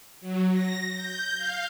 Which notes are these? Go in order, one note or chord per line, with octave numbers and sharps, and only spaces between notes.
F#3
A#6
G6
F5